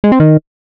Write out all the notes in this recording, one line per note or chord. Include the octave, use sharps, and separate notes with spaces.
G#3
C4
D#3